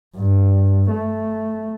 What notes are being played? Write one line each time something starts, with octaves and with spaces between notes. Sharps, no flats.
G2
A3